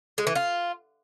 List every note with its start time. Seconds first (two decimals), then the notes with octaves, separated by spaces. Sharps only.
0.18 G#3
0.27 E3
0.35 F4